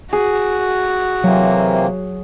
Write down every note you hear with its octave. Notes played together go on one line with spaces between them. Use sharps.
F#4 G#4
C3 E3 F#3 A#3